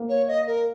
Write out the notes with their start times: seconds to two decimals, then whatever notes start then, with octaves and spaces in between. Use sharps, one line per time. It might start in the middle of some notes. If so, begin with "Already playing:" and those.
Already playing: A#3
0.09 C#5
0.28 D#5
0.47 A#4